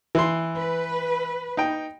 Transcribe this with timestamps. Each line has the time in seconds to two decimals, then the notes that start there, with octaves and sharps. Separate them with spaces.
0.15 E3 C6
0.57 B4
1.57 D#4 G5